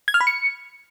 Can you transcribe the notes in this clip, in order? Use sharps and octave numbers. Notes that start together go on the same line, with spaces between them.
G#6
F6
B5
C#7